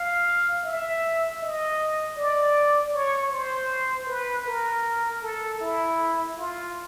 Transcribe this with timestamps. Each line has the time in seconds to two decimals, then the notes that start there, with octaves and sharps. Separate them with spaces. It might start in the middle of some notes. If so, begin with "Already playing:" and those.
Already playing: F5
0.64 E5
1.41 D#5
2.17 D5
2.93 C#5
3.32 C5
4.08 B4
4.46 A#4
5.22 A4
5.60 E4
6.37 F4